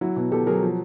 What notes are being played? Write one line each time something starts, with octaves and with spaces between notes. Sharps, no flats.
F#3 E4 F#4
B2
B2 G4 A4
F#3 G#4 A#4
F3